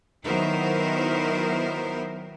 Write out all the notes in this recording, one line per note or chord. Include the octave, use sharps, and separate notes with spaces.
D#3 F#3 B3 E4 A#4 C5